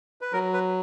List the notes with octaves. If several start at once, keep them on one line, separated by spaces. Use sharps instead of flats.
B4
F#3 A#4
B4